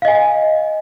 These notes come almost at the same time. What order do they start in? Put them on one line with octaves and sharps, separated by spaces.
F5 D#5 G#5